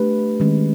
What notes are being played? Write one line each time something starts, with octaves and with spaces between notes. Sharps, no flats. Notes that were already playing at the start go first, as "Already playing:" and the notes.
Already playing: A3 D4 G4 B4
D#3 G#3 C#4